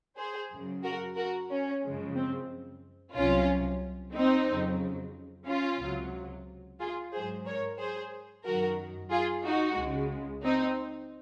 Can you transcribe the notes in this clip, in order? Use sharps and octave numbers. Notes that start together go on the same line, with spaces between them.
G#4 C5
F#2 C#3 F#3
F#4 A#4
F#4 A#4
C#4
F#2 C#3 F3 G#3
C4
C2 C3 F#3 C#4 F4
C4 D#4
F2 C#3 F#3
C#4 F4
C#2 C3 F#3
F4 G#4
G#2 F#3 G#4 C5
A#4 C#5
G#4 C5
F#2 D#3 F#3 F#4 A#4
F4 G#4
D#4 F#4
C#2 C#3 G#3
C4 D#4